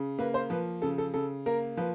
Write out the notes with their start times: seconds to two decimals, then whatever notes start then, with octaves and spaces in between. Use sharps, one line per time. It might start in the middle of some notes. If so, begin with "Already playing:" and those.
Already playing: C#3
0.19 A#3 B4
0.34 C5
0.50 F3 B4
0.82 C#3 A4
0.98 A4
1.14 C#3 A4
1.46 A#3 A#4
1.77 F3 B4